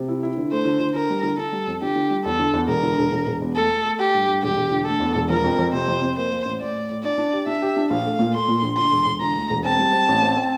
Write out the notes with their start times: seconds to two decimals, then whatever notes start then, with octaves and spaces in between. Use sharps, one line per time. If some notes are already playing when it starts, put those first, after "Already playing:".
Already playing: C3
0.08 E4
0.23 E4
0.37 D3
0.51 A3 C5
0.65 D3
0.80 D3
0.94 D3 A#4
1.10 G3
1.23 D3
1.38 D3 A4
1.52 G3
1.67 F2
1.82 D3 G4
1.96 D3
2.10 G3
2.25 E2 A4
2.39 D3
2.54 E2
2.68 E1 A#4
2.83 D3
2.98 E1
3.12 E1
3.27 E1
3.42 E2
3.56 A3 A4
3.70 A3
3.85 A3
3.99 A3 G4
4.14 G2
4.28 G2
4.43 E1 G4
4.57 E1
4.71 D3
4.86 A3 A4
5.00 E2
5.15 E1
5.29 F3 A#4
5.44 F2
5.59 F2
5.73 C3 C5
5.88 F2
6.01 F2
6.16 A#3 C5
6.32 A#3
6.45 A1
6.60 A2 D5
6.74 A2
6.89 A2
7.03 D4 D5
7.18 D4
7.33 G4
7.47 D4 E5
7.62 G4
7.77 D4
7.90 A#1 F5
8.05 A3
8.19 A#2
8.34 A3 C6
8.48 A#2
8.62 A#1
8.77 D3 C6
8.92 E1
9.06 E1
9.21 D3 A#5
9.36 D2
9.50 E1
9.65 C4 A5
9.79 G3
9.93 C4
10.08 A1
10.22 C4
10.37 C4